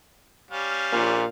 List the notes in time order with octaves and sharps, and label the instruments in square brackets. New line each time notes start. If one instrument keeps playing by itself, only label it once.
[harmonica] G3 C#4 F5
[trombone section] A#1 A#2